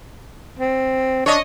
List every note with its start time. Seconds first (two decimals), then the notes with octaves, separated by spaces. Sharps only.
0.59 C4
1.26 D4 C#5 D#5